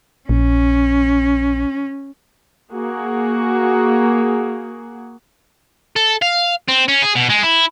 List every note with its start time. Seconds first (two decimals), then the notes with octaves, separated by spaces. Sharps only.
0.29 A#1 C#4
2.72 A#3 F#4 G#4
5.96 A4
6.22 F5
6.68 C4
6.88 C#4
7.02 G#4
7.16 B2
7.30 G#3
7.43 E4